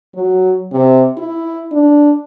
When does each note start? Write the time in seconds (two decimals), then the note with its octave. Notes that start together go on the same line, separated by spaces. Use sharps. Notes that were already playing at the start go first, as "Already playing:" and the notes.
0.15 F#3
0.72 C3
1.17 E4
1.72 D4